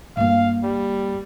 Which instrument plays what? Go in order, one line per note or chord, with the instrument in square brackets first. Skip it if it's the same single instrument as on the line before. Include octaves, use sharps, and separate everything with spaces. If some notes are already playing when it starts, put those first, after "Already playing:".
[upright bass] G2 A#3 [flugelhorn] F5
[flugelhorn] G3